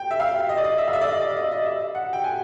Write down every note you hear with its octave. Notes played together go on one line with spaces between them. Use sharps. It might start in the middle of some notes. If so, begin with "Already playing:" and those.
Already playing: G5
E5
F5
D#5
D5
D#5
E5
F5
E5
D5
D#5
D5
D#5
D#5
E5
F#5
G5
G#5